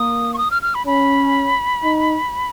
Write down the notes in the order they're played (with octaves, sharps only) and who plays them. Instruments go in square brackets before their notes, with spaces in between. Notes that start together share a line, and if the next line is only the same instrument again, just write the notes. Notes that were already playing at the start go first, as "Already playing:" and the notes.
Already playing: [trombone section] A#3 [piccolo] D#6
[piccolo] C#6
D#6
F6
F6
B5
[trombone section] C#4 [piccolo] B5
[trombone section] D#4